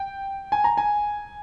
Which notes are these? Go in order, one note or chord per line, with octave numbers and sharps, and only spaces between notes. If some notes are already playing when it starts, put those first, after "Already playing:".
Already playing: G5
G#5
A#5
G#5